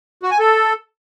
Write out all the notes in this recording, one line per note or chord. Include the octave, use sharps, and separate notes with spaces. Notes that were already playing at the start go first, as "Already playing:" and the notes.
F#4
G#5
A4